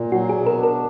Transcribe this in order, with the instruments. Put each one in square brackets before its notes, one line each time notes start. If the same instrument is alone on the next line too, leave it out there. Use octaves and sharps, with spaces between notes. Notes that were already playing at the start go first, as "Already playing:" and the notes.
Already playing: [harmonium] A#2
[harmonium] F#3 [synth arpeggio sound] F#4
[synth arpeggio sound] G#4
[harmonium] B2
[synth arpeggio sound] A#4
[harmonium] D4
[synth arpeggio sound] A#4